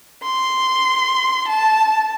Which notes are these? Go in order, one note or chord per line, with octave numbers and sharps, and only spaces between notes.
C6
A5